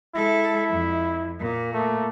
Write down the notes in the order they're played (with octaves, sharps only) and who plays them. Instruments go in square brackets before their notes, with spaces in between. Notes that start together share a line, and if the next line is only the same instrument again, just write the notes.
[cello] G#3 A4 [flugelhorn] E4 [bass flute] E5
[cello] F2
[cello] A#2 [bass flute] A#3
[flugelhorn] A3 [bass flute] A#3